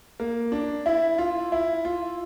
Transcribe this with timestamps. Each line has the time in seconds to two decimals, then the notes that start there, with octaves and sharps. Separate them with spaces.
0.20 A#3
0.52 D4
0.86 E4
1.18 F4
1.52 E4
1.85 F4